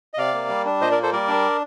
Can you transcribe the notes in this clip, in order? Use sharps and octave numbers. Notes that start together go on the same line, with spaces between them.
D#5
C3 D5 F5
A#3
G3
D4
A#2 C5 D#5
A#4 D5
A#3
A4 C5
G3 A#4 D5
D4